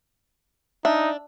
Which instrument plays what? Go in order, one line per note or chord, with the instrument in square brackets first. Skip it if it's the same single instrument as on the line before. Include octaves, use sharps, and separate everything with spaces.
[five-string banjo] D4 [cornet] D#4 [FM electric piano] E5